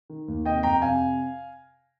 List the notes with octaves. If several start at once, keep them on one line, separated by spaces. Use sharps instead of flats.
D#3
D#2
C3 D#5 G5
F2 G5 A#5
C3 F5 G#5